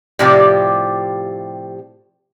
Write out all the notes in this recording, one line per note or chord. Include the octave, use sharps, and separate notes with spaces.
A2 C3 F3 G3 F4 G4